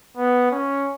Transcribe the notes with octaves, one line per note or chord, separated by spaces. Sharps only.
B3
C#4